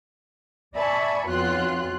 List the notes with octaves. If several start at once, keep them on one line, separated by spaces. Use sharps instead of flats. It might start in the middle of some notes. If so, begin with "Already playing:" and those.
D5 E5 G#5 A5 B5 C#6
B1 F2 F4 F#4 C6 F#6